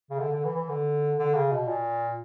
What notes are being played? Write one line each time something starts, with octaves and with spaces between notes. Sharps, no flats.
C#3
D3
D3
E3
E3
D3
D3
C#3
B2
A#2